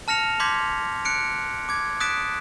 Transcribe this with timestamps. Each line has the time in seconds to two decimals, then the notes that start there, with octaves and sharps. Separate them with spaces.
0.08 A5 F6 A#6 C#7 F7
0.40 C6 D6 G6 G#6 B6
1.05 F#6 C#7 D7
1.69 D6 G#6
2.00 D#6 F#6 A6 B6 D7 E7